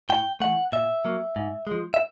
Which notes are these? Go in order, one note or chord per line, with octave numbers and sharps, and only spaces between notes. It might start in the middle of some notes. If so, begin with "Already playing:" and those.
A2 G5
E3 A3 F#5
A#2 E5
F#3 A#3
G#2
F3 G#3
E5